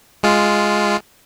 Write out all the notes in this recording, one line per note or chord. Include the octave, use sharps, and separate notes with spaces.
G#3 F4